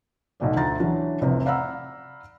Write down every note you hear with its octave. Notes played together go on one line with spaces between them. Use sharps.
B1 G#2 B2 A3 D5
D2 F3 A#5 A6
E3 F#3 C#4 D4
F1 C2 F2 C3
D5 F5 F#5 A#5 B5 E6